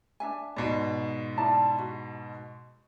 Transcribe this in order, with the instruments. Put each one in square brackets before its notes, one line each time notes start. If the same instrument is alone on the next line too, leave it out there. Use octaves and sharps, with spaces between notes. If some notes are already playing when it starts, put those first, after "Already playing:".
[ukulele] D4 E5 G#5
[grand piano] G#2 B2 [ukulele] D5
[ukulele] E4 D5 A5
F#4